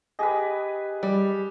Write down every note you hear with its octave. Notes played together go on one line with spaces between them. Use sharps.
G4 G#4 B4 D#5
G3